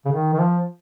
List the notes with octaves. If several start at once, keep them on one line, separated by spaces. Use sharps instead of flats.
C#3
D#3
D#3
F3